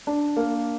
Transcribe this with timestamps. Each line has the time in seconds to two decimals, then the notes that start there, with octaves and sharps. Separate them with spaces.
0.07 D4
0.36 A#3